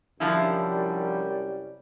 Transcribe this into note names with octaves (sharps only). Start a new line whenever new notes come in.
C2 F#2 D3 F3 G3 E4